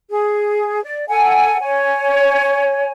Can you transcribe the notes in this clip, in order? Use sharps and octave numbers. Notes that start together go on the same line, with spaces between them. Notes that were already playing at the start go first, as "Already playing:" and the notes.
G#4
D5
A4 F#5 G#5
C#5 G#5